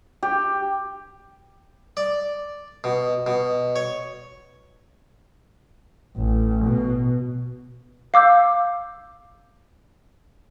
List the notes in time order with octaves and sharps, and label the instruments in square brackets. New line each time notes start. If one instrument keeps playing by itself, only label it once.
[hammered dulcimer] G4
[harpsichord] D5
B2
B2
C#5
[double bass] A1
B2
[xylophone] F5 D6 E6 G6